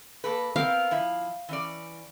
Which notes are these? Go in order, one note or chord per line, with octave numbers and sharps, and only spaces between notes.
A#3 A4 B4
B3 C4 A#4 F5
F3 E4
E3 C#4 D5